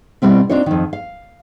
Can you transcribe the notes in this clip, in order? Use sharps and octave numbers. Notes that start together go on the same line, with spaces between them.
B2 G3 C4 E4
C4 D4 D#4 F4 C#5
F2 D#3
F5